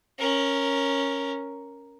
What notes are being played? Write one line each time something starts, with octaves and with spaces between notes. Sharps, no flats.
C#4 A#4